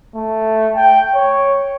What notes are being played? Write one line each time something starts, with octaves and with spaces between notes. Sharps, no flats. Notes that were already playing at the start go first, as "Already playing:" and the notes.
A3
G5
C#5